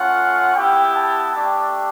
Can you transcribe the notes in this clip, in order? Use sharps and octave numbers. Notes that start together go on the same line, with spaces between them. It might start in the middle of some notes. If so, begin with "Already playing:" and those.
Already playing: A3 C#4 F4 F#5
B3 E4 G4 G5
A5
A3 D4 G4